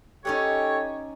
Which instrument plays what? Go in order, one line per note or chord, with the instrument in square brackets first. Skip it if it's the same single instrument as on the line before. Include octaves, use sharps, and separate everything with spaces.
[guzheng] C#4 D#4 F#5 [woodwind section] G4 A4 C#5